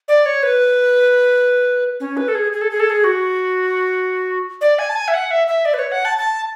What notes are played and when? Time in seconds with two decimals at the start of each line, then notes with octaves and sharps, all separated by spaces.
0.08 D5
0.26 C#5
0.43 B4
2.00 C#4
2.17 B4
2.28 A4
2.35 G#4
2.53 G#4
2.61 A4
2.71 G#4
2.80 A4
2.90 G#4
3.04 F#4
4.61 D5
4.79 G#5
4.89 A5
4.96 G#5
5.08 E5
5.14 F#5
5.31 E5
5.48 E5
5.65 D5
5.74 B4
5.79 C#5
5.92 F#5
6.05 A5
6.18 A5